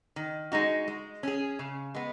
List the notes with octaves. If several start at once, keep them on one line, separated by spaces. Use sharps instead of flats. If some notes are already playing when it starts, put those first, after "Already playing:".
D#3
G#3 D#4 F#4
G#3
C#4 G#4
C#3
G#3 B3